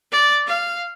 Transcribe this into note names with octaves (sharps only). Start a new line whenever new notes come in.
D5
F5